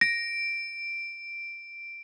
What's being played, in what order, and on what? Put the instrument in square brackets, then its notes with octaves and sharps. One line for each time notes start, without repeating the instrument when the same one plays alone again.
[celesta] A#6 [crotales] D7